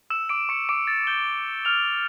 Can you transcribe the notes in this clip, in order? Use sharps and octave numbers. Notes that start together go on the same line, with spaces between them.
E6 E7
D6 D7
C#6 C#7
D6 D7
A6
G6 G7
F6 F7